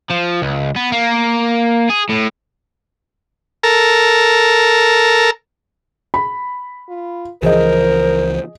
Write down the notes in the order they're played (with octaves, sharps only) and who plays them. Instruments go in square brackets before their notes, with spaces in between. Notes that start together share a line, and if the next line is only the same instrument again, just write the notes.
[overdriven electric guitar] F3
C#2
B3
A#3
G#4
A2
[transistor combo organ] A4 A#4
[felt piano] B5
[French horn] F4
[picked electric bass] C#2 E3 F3 [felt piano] G#4 D#5 [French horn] A#4 [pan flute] C5